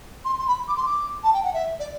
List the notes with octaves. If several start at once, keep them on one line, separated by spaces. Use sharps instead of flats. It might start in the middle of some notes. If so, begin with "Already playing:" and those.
C6
C6
B5
D6
C6
D6
A5
G5
F#5
E5
D5